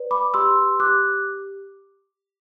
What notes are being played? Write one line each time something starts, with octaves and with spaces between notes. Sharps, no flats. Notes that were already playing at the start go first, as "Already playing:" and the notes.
Already playing: B4 D5
B5 D6
G4 C6 E6
G4 D6 F#6